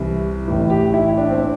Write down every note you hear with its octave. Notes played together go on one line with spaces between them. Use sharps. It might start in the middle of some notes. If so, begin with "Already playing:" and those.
Already playing: C2 C3 E3
A1 A2 E3
G4
E4
D4
C4
D4